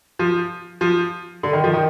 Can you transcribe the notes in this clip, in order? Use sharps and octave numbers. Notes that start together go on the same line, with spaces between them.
F3
F3
D3
D#3
F3
D#3